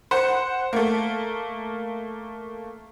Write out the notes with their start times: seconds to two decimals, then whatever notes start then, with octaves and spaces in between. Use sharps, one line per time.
0.11 C5 F#5
0.73 A3 A#3